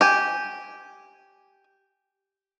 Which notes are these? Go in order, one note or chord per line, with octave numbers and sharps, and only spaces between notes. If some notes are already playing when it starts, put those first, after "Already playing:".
G4 G#5